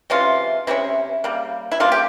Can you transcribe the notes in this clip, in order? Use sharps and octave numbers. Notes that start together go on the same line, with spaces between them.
C3 E3 G#3 C#4 F4
C3 E3 G#3 C#4 E4
C#3 G3 A#3
E4
C#3 G3 A#3 F4
G4